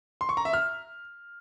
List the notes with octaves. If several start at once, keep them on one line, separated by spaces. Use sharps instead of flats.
C6
C#6
A#5
E5
F6